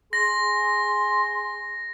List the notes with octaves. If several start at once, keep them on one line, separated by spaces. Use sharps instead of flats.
G#4 C6 A#6